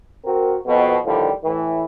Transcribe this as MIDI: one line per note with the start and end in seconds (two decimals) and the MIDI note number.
0.25 0.56 60
0.25 0.56 66
0.25 0.56 70
0.66 0.95 41
0.66 0.95 47
1.05 1.30 45
1.05 1.30 50
1.05 1.30 51
1.05 1.30 53
1.05 1.30 55
1.44 1.84 45
1.44 1.84 52